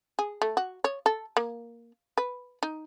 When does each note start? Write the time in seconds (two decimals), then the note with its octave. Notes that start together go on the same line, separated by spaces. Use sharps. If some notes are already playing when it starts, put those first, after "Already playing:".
0.19 G#4
0.42 A3
0.57 F#4
0.84 C#5
1.06 A4
1.37 A#3
2.18 B4
2.63 D#4